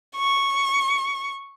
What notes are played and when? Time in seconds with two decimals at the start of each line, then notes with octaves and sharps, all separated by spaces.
0.17 C#6